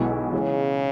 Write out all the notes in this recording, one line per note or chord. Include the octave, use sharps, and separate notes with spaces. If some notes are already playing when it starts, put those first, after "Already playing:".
Already playing: B1 B2 G#3 B3 E4
C#3 E3 G#3 C#4